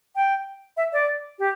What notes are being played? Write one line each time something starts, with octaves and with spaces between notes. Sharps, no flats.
G5
E5
D5
G4